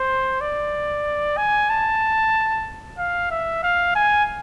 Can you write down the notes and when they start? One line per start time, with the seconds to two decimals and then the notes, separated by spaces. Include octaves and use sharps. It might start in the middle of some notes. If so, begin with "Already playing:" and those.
Already playing: C5
0.41 D5
1.37 G#5
1.70 A5
2.98 F5
3.31 E5
3.63 F5
3.95 G#5